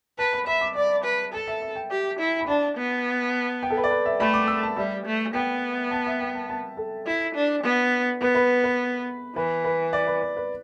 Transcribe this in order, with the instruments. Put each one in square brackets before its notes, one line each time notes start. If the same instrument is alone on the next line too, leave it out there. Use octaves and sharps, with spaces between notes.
[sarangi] B4 [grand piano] A5
[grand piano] B5
[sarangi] E5 [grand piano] B5
[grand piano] D6
[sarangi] D5 [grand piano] D6
[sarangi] B4
[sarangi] A4 [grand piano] A5
[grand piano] E5
E5
G5
[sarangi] G4
E4
[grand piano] B5
[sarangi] D4 [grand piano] A5
[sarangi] B3
[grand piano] G5
A4
B4
D5
B4
E5
[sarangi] A3 [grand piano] B5
[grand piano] D6
E6
A5
[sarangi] G3 [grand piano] E5
[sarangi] A3
[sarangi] B3 [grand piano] G5
[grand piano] A5
E5
G5
A5
A5
A4
[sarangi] E4
D4
B3
[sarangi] B3 [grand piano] B4
[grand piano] B4
B4
[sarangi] E3 [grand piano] B4
[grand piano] B4
D5
B4
B4
B4